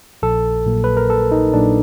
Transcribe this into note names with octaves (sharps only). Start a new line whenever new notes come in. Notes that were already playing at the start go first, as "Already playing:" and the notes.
A#1 A4
A#2 F#3 A#3
B4
A#4
A#1 A4
D#4
A#2 F#3 A#3 D4